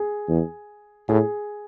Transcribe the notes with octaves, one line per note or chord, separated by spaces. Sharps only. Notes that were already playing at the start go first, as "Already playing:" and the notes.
Already playing: G#4
E2
A2 G#4